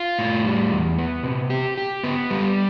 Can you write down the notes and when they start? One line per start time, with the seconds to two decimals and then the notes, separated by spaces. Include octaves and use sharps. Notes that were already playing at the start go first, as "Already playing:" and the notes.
Already playing: F4
0.19 A2
0.45 G3
0.71 E2
0.98 B3
1.24 C3
1.50 G4
1.78 G4
2.04 B3
2.30 G3